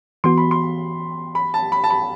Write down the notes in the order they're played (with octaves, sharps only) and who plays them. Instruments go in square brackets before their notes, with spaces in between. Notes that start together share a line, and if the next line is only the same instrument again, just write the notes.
[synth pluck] E3 B3 F#4 [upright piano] C6
[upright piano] B5
C6
B5
A5
B5
A5
B5